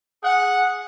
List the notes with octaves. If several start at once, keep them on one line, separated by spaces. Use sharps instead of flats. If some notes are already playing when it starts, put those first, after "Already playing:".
G#4 F#5